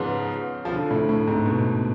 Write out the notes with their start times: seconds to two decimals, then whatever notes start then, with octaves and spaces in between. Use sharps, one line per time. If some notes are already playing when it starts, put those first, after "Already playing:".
Already playing: G#2 C#3 F3 B3
0.65 F3
0.72 D3
0.91 A2
1.09 A2
1.27 G#2
1.46 B2